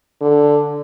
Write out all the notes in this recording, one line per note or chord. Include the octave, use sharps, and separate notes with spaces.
D3